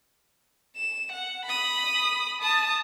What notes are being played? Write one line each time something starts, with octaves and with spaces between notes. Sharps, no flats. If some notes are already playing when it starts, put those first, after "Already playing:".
E7
F#5
B5 D#6
A5 D#6